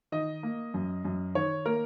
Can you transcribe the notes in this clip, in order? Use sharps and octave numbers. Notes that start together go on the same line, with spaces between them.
D#3 D#5
A#3
F#2
F#2
D#3 C#5
A#3 A#4